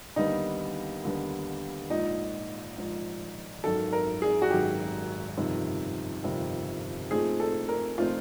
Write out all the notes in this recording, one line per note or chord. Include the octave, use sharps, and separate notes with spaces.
D#2 D3 G3 B3 D#4
D#2 D3 G3 B3
A#1 G#2 F3 D#4
A#1 G#2 F3
G#1 F#2 D#3 F#3 A4
A#4
G#4
F#4
G#1 F#2 D#3 F#3 G4
G1 F2 C3 D#3 G3
G1 F2 C3 D#3 G3
A#2 F3 A3 C4 D#4 G#4
A4
A#4
A#2 F3 A3 C4 D#4 F4